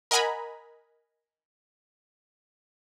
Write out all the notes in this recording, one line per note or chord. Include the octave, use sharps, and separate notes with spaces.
A#4 D#5 F#5 G#5 A#5 B5